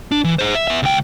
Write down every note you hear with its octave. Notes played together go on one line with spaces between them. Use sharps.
D4
E3
G#4 C5
E5
B3 E5
C#2 G5